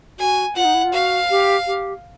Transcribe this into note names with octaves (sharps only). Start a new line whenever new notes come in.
F#4 G#5
F4 F#5
D#4
E4
F4
F#4 F5
G4
G4